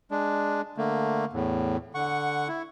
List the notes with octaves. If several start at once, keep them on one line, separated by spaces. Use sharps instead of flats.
G#3 D4
D3 A3 A#3
E2 A2
D3 F#5 C#6
E4